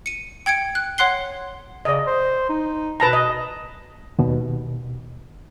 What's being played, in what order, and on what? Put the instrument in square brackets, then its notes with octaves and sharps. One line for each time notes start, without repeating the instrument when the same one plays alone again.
[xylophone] C#7 D#7
G5 G#6 C#7 D7
F#6
C#5 F#5 C6 F#6 C7 G7
[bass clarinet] C#3 [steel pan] D5 D#5
[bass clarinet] C5
D#4
[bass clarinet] B2 [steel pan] B4 A5 A#5
[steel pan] D#5
[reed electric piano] D#2 B2